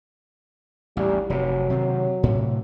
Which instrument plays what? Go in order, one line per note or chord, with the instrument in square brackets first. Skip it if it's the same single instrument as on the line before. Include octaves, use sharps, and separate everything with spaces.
[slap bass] A1 D#2 [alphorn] G3
[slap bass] F1 C3 [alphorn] F#3
[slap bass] C3 D#3 C4
A2 C3